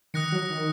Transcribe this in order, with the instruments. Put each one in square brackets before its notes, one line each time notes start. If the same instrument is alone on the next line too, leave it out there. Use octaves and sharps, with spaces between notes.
[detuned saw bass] D#3 [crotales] D#6 F#6 A#6 C#7
[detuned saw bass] F#3
D#3